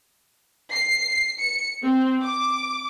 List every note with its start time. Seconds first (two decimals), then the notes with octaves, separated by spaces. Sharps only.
0.72 C7
1.39 C#7
1.83 C4
2.24 D6